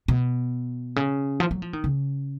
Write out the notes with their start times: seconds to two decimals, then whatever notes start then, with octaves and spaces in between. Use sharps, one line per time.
0.08 B2
0.96 C#3
1.40 F3
1.51 F#3
1.62 F3
1.73 D#3
1.84 C#3